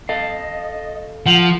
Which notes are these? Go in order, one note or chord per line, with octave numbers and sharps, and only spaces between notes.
A4 D#5 F5
F3 F#5